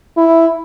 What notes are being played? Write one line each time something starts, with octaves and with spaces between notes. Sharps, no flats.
E4